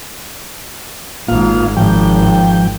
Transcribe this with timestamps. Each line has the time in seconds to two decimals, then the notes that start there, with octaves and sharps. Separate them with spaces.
1.28 G#1 G#2 A#3 F4 F5
1.76 G#1 F3 G5